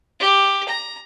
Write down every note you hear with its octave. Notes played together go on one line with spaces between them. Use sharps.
G4
A#5